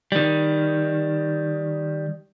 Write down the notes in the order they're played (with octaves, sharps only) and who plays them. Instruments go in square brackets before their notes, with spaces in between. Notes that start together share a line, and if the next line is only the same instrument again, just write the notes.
[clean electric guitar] D#3 G3